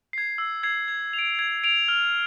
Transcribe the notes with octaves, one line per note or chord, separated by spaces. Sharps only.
G#6 C7
E6
G#6 C7
G#6
F7
D7
G#6
D7 F7
F6